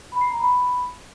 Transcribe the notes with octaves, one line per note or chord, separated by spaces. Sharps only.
B5
C7
A#5
B5